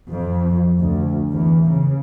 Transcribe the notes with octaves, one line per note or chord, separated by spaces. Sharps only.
F2
D2
E2
C#3